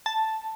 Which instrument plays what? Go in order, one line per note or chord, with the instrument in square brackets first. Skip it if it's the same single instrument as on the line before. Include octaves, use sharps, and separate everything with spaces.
[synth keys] A5